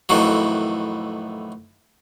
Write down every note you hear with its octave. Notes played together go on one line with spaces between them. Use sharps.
F2 A2 D#3 E3 F#3